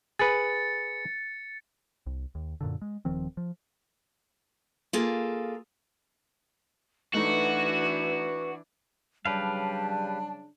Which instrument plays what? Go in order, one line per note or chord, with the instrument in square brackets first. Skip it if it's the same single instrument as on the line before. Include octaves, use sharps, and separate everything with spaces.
[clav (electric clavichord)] G#4 B4 [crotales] A6 C#7
[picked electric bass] C2
D#2
F#2 A#2 D3
G#3
D#1 D#3 F3 C4
F3
[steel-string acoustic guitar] A#3 F4 G#4 A4
[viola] E3 D4 [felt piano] A3 D#4 [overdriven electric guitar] F#4 [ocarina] B4
[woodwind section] C#3 F#3 G3 [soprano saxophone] D4 [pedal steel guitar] G4 B4 F5 [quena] A5